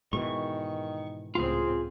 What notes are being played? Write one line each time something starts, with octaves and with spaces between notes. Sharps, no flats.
G#2 B2 D#3 E3 C#6
C#2 A2 C4 F4 G#4